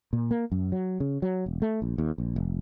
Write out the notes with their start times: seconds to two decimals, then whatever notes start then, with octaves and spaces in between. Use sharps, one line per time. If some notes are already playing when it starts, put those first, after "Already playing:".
0.13 A#2
0.31 A#3
0.52 F#2
0.72 F#3
1.00 C#3
1.22 F#3
1.46 E1
1.62 A3
1.82 A#1
1.98 D#2
2.18 A#1
2.36 F1